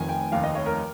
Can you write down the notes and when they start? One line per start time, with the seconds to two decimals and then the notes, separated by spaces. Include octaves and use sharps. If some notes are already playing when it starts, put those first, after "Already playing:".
Already playing: F1 F2 D#3 G#5
0.09 G5
0.32 F1 D#2 D#3 F5
0.44 D#5
0.55 C#5
0.66 A#4